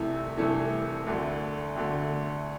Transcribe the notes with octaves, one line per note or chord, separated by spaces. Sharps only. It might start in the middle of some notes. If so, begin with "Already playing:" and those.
Already playing: C2 C3 E3 A3 E4
C2 C3 E3 A3 E4
D2 D3 A3
D2 D3 A3